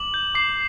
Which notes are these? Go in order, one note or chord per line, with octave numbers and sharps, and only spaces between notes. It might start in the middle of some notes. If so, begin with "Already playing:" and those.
Already playing: D6 F#7
G6
D6 C7